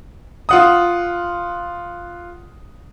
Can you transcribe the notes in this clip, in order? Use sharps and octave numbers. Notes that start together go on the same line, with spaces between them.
F4 F#5 D#6